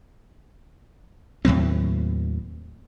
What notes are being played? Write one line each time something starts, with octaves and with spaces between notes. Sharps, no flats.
D#2 A2 F#3 C4